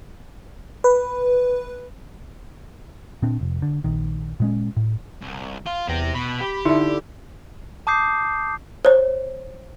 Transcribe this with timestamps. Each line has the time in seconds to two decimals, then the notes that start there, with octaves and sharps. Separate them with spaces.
0.84 B4
3.22 A#2 C4 D4
3.41 F1
3.62 D3
3.84 A#1 D#3
4.40 A#2 G#3 C#4
4.77 A2
5.21 C2
5.66 F4
5.88 E2 C4 G4 A#6
6.15 B2 B5
6.41 G4
6.65 D3 D#4 E4 E5
7.87 A5 D6 D#6 G6 C7
8.85 C5 C#5